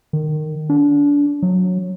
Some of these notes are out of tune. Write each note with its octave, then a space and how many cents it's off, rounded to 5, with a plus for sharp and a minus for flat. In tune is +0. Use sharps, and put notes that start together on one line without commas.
D#3 -15
D4 -30
F#3 -15